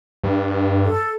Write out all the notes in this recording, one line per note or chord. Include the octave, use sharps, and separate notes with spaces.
G2
A4